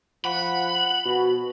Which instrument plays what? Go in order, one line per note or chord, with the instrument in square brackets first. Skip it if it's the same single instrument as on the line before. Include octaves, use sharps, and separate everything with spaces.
[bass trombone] F3 [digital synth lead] F#5 [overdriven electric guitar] B5
[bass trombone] B2 [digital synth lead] F#4